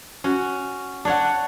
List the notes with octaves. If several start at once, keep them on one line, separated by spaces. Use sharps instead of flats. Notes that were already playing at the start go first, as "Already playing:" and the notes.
C#4 F#4
D4 C#5 F#5